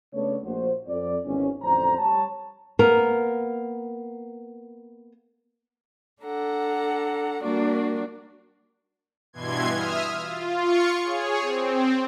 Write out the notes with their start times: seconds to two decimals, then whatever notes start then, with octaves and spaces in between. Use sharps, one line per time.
0.14 C#3 A3 B3 D4 A4 C#5
0.43 A#1 F#4 C5
0.88 F2 D5
1.25 G#1 E2 C#4
1.62 A1 F2 D3 C5 A#5
1.98 G3 C#5 A5
2.79 A#3 B3 A#4
6.21 D4 A4 F#5 A#5
7.41 G3 A#3 D4 F#4 A#4 D5
9.33 G2 B2 E3 C6 G#6
9.72 E5 D#6 F6
10.18 F4
10.61 F4 C#6 C#7
11.03 G#4 C#5
11.41 C4